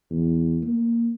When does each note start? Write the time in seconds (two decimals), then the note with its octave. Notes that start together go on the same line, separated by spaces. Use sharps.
0.10 E2
0.62 A#3